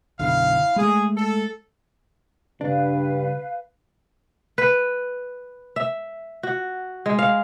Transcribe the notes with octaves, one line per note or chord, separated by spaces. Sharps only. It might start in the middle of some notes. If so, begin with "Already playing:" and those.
B1 F#2 D3 E4 F5
G#3 A3 G#4
A4
G2 C#3 D4 B4 F5
B4
E5
F#4
G#3
F5